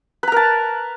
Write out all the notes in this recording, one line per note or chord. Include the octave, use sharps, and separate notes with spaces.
A#4 B4 A5 A#5